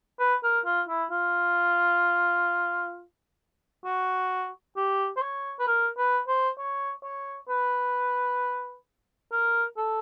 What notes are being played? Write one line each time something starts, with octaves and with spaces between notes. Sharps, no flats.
B4
A#4
F4
E4
F4
F#4
G4
C5
C#5
B4
A#4
B4
C5
C#5
C#5
B4
A#4
A4